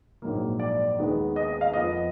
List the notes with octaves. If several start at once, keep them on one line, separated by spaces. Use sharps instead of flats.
A#1 G#2 F#3 A#3
D5
D#2 D#3 G#3 B3
D#5
D#5
F5
F2 F3 B3 D#5